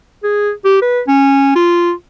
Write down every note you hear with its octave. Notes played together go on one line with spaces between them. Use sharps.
G#4
G4
B4
C#4
F4